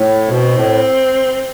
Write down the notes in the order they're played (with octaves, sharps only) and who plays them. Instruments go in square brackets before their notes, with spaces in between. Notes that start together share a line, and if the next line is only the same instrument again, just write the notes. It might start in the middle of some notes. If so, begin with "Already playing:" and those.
Already playing: [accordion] A2
[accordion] B2 [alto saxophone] C4
[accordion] A2